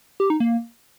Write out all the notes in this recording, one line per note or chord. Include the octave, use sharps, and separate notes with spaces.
G4
D#4
A#3